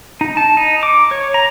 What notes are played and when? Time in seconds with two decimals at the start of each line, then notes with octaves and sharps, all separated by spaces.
0.21 D#4
0.37 A5
0.57 D#4
0.83 D6
1.11 C#5
1.34 A#5